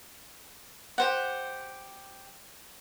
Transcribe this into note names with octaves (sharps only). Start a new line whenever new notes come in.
G4 C5 F#5